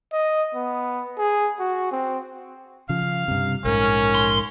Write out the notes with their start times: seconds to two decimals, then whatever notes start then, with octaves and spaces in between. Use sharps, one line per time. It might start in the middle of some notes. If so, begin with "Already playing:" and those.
0.13 D#5
0.55 B3
1.19 G#4
1.60 F#4
1.92 C4
2.89 C#3 F3 F5
3.28 G2 C3
3.65 A#1 G#2 C#4 A#4
4.15 C6